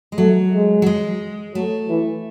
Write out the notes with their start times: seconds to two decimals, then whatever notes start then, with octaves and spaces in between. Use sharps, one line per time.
0.12 G#3
0.18 F#3 A3
0.52 G#3
0.82 F#3
0.86 G#3
1.54 F#3 A3
1.89 E3